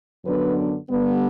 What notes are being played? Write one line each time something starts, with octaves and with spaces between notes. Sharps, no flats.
F#2 D3 F#3 B3 D4 B4
G2 D3 G3 B3